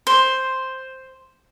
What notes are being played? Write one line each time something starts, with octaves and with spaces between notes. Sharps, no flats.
C5